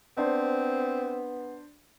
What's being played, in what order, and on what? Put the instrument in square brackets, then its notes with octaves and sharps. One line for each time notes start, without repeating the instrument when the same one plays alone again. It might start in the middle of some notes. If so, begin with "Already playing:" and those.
[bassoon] B3 [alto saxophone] C4 [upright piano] D4 C5